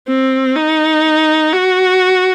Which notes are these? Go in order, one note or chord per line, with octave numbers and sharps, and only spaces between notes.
C4
D#4
F#4